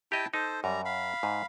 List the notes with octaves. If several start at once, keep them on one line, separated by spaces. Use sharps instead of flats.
E4 G4 D#5 G5 A5
D#4 A4 C5
F#2 G3 A#5
F5 B5
G#2